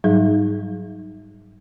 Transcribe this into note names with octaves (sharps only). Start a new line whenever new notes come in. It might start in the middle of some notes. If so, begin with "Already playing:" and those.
G#2 F#3 G3 D#4 G#4